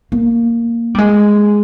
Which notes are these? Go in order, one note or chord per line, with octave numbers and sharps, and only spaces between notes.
A#3
G3
G#3